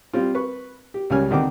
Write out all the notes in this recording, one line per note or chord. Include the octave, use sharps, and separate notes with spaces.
G3 C4 F4
B4 C#6
G4
C#2 C#3 G3 C#4 G#5 F6
D3 D#3 C4 D6